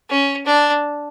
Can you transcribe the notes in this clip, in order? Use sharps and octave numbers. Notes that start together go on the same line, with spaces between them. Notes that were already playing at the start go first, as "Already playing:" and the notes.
C#4
D4